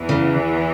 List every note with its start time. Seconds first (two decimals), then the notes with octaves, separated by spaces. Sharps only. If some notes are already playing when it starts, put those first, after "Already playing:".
Already playing: E2 E3
0.09 C#3